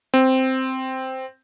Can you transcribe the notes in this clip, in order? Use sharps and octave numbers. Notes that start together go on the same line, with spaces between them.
C4